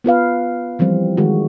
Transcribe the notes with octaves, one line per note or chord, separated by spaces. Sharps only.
B3 F4 B4 F5
E3 F3 G3 C4
D#3 G#3 F#4